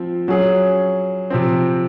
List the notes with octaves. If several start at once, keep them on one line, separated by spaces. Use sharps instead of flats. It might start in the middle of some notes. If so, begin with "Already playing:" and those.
Already playing: F3 C4
F#3 C#4 G#4
C3 F3 C4